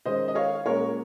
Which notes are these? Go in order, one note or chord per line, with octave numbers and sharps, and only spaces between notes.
D#3 G#3 C#4 C5 D#5
D#5
C#5 F5
A#2 G#3 C#4 A#4 C#5